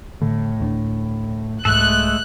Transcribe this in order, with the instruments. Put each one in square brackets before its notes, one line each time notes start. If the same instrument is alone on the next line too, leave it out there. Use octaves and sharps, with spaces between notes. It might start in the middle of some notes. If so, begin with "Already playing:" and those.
[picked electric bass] A2 [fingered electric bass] D3
[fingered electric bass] D1 C#4 D4
[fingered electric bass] C2 G#2 [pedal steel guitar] G#3 A3 A4 [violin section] F#6